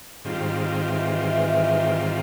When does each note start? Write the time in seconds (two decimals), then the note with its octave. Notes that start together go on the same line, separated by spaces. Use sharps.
0.24 G#2 D#3 G3 C4 F4
0.86 E3